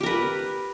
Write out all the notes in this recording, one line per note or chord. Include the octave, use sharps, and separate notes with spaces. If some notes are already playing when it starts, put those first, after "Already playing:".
G4 A#4 B4